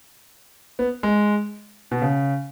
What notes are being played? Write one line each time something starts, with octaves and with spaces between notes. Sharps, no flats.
B3
G#3
B2
C#3